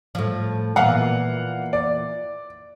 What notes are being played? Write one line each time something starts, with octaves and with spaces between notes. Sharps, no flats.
A2 F3
A#2 E3 B3 F5 F#5
D5